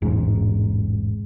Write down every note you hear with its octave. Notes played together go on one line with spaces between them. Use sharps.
E1 A1 G#2 G#3